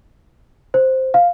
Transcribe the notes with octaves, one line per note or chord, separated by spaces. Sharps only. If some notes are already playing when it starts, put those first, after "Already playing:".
C5
F5